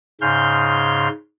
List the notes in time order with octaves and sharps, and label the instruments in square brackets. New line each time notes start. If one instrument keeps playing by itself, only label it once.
[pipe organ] G#2 C#3 C6 F6 G6